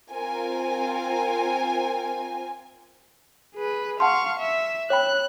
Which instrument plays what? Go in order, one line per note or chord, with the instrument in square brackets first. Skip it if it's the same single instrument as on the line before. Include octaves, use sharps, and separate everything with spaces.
[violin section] C4 F4 A#4 G#5
[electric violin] G#4 B4
[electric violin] F5 C#6 [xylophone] F#5 A5 C6
[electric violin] E5
[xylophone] C#5 G5 B5 [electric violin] F#6